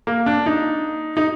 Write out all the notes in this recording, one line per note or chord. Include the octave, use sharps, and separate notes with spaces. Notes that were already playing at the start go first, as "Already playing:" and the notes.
A#3
D4
D#4
D#4